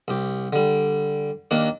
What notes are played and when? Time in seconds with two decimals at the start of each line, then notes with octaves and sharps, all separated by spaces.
0.08 C2 G4
0.53 D3 G3
1.51 D#2 D#3 A#3 D4